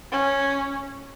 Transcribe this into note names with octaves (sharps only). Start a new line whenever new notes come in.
C#4